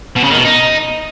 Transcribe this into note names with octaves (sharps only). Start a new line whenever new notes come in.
B2
C#3
D#3
B2
D#4